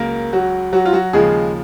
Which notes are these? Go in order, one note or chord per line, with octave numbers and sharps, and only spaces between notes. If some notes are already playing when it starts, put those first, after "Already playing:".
Already playing: C#2 C#3 F#3 A#3 A#4
F#3 F#4
F#3 F#4
F4
F#3 F#4
D#2 C#3 F3 G#3 G#4